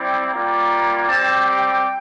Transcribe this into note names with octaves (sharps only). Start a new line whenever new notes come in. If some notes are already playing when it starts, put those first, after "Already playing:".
Already playing: G3 C4 E4
G3 A#3 F4 A#5
G3 C4 G4 A5
G5